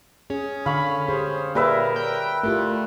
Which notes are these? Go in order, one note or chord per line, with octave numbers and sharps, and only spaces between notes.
C#4 G#4
D3 F5 B5 C#6
G4 G#4 C5
A#2 G3 G#4 A#4 B4 C#5 E5
G5
A3 E4 F4 G4 A#4